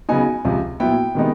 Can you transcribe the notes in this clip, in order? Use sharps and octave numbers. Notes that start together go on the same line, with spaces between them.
C#3 F#3 B3 D#4 G#5
C#2 C3 F3
A#2 F#3 B3 E4 G5
C3 D#3 G#3 B3 D#4